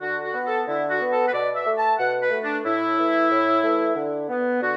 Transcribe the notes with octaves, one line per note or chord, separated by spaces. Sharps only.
D3 F#4
F#4
B3
A4
D3 E4
F#4
B3
A4
B4
B2 D5
E5
A3
A5
B2 F#5
B4
A3
D4
A2 E4
E3 A3
A2
E3 A3
D3
B3
D3 F#4